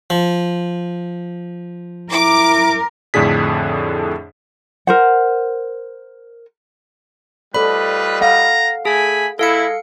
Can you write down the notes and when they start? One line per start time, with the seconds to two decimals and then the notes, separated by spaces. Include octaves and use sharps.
0.10 F3
2.12 E4 A#4 D6
3.14 F2 A2 D3 D4 G#4 B6
4.87 A#4 C5 F#5
7.54 G3 F4 A4 B4 C5 D5 D#5 B5
8.21 A4 F5 F#5 A#5
8.85 A3 G#4 G#5 B5
9.39 G#3 E4 A4 F5 C#7